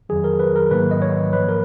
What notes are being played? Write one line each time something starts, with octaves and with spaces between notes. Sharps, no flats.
F2 D#3 F#3 G#4
A#4
B4
A#4
G#2 D#3 F#3 A#3 B4
D#5
C#5
G#2 F3 A#3 B4
A#4